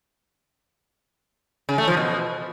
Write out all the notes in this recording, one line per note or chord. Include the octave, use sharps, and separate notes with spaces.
C#3
A3
F3
B2